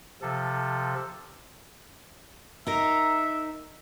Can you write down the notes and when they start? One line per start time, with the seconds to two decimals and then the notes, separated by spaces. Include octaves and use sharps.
0.22 C3 F3 A4
2.67 D#4 A#4 E5